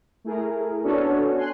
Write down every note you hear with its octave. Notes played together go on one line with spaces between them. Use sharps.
A3 E4 G#4 A#4
B3 C#4 D4 F#4 A4 C#5
G#5 C6 F#6